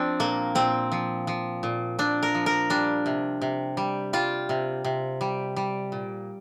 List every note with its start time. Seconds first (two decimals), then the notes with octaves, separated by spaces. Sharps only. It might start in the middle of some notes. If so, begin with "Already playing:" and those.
Already playing: F3 C4 D4
0.20 A#2 A#3
0.55 A#2 C4
0.92 F3
1.27 F3
1.63 A#2
1.99 A#2 D4
2.23 A#4
2.35 F3
2.46 A#4
2.70 G3 D4
3.06 C3
3.41 C3
3.77 G3
4.13 G3 F4
4.49 C3
4.84 C3
5.21 G3
5.56 G3
5.92 A#2